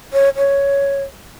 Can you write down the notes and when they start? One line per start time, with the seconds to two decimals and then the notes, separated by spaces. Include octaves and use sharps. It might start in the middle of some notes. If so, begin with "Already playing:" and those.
0.13 C#5
0.37 C#5